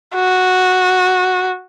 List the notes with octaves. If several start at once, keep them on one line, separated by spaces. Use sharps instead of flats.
F#4